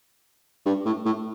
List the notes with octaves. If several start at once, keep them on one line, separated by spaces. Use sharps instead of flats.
G2
A2
A2